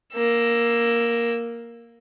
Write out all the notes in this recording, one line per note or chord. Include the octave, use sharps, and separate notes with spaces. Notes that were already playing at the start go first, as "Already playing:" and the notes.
A#3 E6